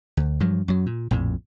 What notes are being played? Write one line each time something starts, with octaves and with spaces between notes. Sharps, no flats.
D2
G2 F3 F#3
F#2 F#3
A#2
A#1 F2 A2